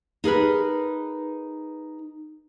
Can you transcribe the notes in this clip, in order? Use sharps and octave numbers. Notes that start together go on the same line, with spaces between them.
D#4 G#4 A#4 B4